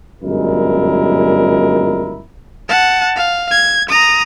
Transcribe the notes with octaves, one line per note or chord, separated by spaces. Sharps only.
G1 F#2 A#2 G#3 E4 A#4
F#5 A5
F5
G#6
A#5 D#6